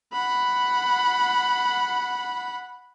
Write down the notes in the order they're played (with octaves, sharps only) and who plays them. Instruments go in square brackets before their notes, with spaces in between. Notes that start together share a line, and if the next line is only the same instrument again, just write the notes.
[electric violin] F#5 B5